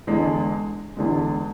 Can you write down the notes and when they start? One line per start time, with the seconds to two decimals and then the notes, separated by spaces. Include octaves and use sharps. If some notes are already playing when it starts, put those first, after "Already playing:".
0.07 E2 D3 G#3
0.97 E2 D3 G#3